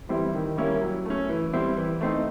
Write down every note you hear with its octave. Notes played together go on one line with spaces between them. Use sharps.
E3 G3 C4 E4
D#3
G3 A#3 C#4 E4
F#3
A3 C#4
E3
G3 C4 E4
E3
A3 C4 D#4